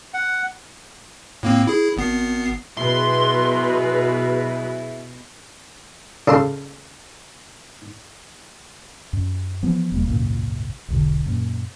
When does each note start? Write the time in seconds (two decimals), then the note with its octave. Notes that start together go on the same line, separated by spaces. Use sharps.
0.14 F#5
1.43 A2 A#3 C4
1.67 E4 G#4
1.97 G#1 B3 C7
2.77 B2 F#3 E4 G#4 B4 C6
6.27 C#3 A4 C6
9.13 F#2
9.63 E3 F3 B3
9.92 E1 G3 A#3
10.07 G#1 C#2 F#2 A#2
10.88 E1 B1 D3
11.26 F#2 A#2